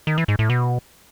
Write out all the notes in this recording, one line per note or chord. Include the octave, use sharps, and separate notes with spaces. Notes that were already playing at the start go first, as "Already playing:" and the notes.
D#3
E3
G#2
A2
B2